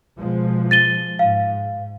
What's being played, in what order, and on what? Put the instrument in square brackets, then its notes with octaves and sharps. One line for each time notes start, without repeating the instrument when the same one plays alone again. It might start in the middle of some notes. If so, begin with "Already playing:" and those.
[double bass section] B2 F3 G#3
[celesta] A6 D#7 G7
[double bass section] G#2 [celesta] F5